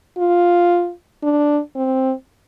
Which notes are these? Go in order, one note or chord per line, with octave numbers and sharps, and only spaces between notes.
F4
D4
C4